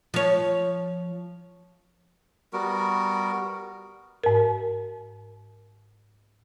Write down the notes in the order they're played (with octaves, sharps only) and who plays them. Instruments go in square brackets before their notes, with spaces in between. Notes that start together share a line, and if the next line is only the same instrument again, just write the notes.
[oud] F3 C#5
[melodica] G3 B3 F#4 A#4
[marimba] G#2 A#4